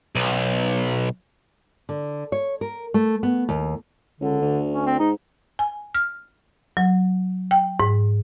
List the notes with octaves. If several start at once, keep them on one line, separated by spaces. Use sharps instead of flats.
B1
D3
C#5
A#4
A3
B3
D#2
C#2 D3
D2
C#4
C4
G#2 D#4
G#5
F6
F#3
G5
G#2